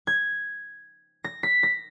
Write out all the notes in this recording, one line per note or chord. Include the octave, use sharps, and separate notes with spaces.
G#6
A#6
B6
A#6